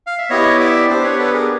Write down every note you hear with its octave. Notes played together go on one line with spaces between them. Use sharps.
F5
E5
B3 E4 G4 C#5 D#5
D5 E5
B3 D4 G4 C5 D5
B4 C#5
A4 B4
G#4 A#4